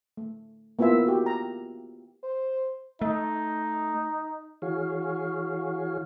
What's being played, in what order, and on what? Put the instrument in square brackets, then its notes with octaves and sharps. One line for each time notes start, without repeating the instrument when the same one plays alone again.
[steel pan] A3
A#3 B3 E4 F4 E5
F#4 G4
A#5
[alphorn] C5
[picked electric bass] A3 [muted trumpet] D#4
[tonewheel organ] E3 F#4 G#4 C#5 F5